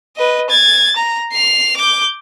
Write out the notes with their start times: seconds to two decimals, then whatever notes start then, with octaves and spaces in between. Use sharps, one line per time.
0.17 B4 D#5
0.50 G#6 A6
0.96 A#5
1.32 C7 F7
1.77 D6 G6